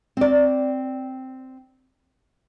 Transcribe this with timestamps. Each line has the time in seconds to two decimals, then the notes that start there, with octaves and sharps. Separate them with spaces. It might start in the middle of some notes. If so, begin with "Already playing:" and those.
0.17 C4 D5